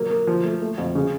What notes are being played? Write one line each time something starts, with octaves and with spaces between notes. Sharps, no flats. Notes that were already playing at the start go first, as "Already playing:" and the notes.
Already playing: F#3 A#3
A#3
F3
A3
A3
F2
C#3